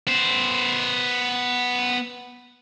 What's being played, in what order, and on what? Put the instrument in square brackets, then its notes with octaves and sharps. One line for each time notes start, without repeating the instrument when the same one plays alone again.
[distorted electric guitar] B3 C5